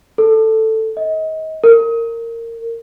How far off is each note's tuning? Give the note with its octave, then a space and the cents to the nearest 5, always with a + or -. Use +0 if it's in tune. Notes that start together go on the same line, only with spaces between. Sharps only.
A4 +5
D#5 +30
A#4 -20